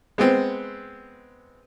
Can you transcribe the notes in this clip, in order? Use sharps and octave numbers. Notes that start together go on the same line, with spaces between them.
G#3 B3 C4